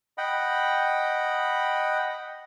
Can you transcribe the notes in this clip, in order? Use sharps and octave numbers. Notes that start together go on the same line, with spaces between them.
D#5 F#5 G5 B5